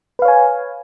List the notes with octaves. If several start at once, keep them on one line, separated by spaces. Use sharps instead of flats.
B4 C#5 F5 G#5